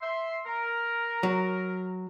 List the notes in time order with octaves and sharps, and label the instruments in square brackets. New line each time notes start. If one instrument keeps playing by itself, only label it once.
[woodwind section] E5 C6
A#4
[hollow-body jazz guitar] F#3